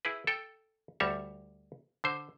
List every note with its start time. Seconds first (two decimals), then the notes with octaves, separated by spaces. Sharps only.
0.05 E4 G#4 B4
0.27 A4 G5
1.00 D2 G3 C#5 E5
2.04 D3 C5